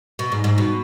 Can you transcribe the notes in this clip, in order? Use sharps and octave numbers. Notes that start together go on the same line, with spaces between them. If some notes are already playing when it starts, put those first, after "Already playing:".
B2
G#2
G#2
B2